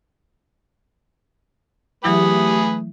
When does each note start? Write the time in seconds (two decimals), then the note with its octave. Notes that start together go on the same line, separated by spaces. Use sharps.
2.04 E3 F#3 A3 E4 G4 G#4 B4 D#6